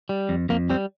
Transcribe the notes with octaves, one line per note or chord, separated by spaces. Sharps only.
G3
F2
F2 A#3
G3 C4